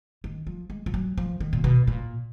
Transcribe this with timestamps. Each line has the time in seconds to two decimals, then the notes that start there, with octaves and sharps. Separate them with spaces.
0.24 D#3
0.47 F3
0.70 G#3
0.86 F3
0.94 F#3
1.18 F3
1.40 D#3
1.53 A#2
1.64 B2
1.87 A#2